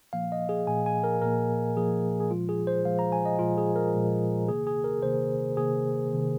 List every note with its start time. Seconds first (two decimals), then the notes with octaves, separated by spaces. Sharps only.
0.13 A#2 F3 A#3 F5
0.32 D#5
0.49 G#4
0.67 A#2 F3 A#3 G#5
0.86 G#5
1.04 A#4
1.22 A#2 F3 A#3 A#4
1.77 A#2 F3 A#3 G#4
2.20 G#4
2.31 A#2 F3 G#3 F4
2.49 G#4
2.67 C5
2.85 A#2 F3 G#3 F5
2.99 A#5
3.12 G#5
3.26 D#5
3.39 A#2 F3 G#3 F4
3.58 G#4
3.76 A#4
3.94 A#2 F3 G#3
4.48 C3 D#3 A#3 G#4
4.67 G#4
4.84 A#4
5.02 C3 D#3 A#3 C5
5.57 C3 D#3 A#3 G#4
6.11 C3 D#3 A#3